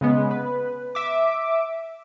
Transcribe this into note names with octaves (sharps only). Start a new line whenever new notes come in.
C#3 G#3 B3
B4
E5 D6